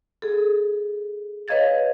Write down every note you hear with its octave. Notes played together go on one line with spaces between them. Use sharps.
G#4 A4
B4 C#5 D#5 F5 G#6 A6